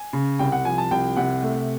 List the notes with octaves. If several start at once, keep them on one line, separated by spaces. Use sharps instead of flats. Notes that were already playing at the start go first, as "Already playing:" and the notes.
Already playing: G#5
C#3
C2 G5
F#5
F3 G#5
A5
C2 G5
C3 F#5
A3